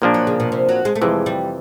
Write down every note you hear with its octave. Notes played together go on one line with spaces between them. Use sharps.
A#2 F3 G#3 A#3 D4
F#3
C#3
B2
C3
F#3
G#3
A3
F2 C3 E3 G#3
G3